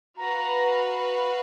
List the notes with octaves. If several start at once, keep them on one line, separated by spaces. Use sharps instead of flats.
F#4 B4 F5 A#5